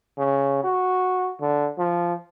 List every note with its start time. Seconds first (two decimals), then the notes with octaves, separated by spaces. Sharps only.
0.18 C#3
0.64 F#4
1.40 D3
1.78 F3